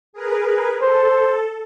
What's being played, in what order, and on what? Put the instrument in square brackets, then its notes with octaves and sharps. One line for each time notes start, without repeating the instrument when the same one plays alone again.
[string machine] G#4 A#4 B4
[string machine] A4 [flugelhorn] C5